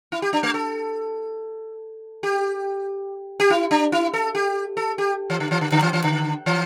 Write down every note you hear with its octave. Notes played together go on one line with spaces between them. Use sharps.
E4
G4
D4
A3
A4
G4
G4
E4
D4
E4
A4
G4
A4
G4
E3
D3
E3
D3
D3
E3
E3
D3
E3